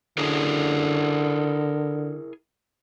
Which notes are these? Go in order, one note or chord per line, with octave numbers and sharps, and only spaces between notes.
D3 E4 G#4 A#4